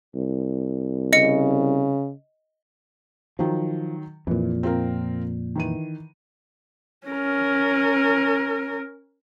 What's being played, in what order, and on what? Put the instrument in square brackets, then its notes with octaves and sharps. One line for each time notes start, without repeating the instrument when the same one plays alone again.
[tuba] C2
[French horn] C#3 [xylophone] D#5 C#7
[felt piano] D#3 F#3 [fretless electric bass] F3
[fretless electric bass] F2 A#2 [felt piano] E3
[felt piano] C4 F4 A#4
D#3 E3 D#7
[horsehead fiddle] C#4 A#4